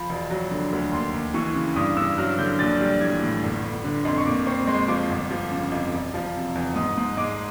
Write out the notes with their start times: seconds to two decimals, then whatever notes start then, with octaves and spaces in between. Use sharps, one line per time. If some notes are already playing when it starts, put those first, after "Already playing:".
Already playing: F3 B5
0.09 E1
0.31 F#3
0.51 D3
0.72 D2
0.93 D#2 C6
1.14 D#2
1.34 E3 C#6
1.55 C#3
1.76 G2 D#6
1.97 G2 E6
2.18 F#3 F6
2.39 D3 G6
2.59 A#1 A6
2.80 G3
3.01 E3 G#6
3.22 A2
3.43 G1
3.63 G1
3.84 D3
4.05 F2 C6
4.18 C#6
4.26 A#2 D6
4.47 C4 C#6
4.67 G#3 C6
4.88 F3 D6
5.10 G1
5.30 F3
5.51 C#3
5.72 F2
5.93 E1
6.14 F3
6.35 C3
6.55 E2
6.76 G#2 D#6
6.97 G#2
7.17 G#3 D6